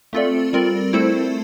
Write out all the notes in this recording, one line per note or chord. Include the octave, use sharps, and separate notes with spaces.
A3 C4 F4 A4 D5
G3 C4 F4 A#4 D5
A3 C4 E4 A4 C5